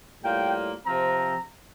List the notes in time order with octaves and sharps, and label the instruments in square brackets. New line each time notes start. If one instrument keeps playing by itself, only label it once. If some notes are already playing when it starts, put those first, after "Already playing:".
[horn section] A2 G3 A#3 F4 G5
C3 F3 C4 A#5